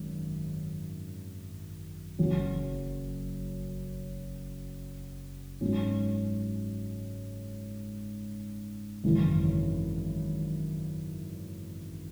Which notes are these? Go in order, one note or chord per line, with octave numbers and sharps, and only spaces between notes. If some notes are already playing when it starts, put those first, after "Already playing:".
Already playing: G#1 F#2
F#1 F#2 F#3 C#4
G#2 F#3 C#4
G#1 F#2 C#3 E3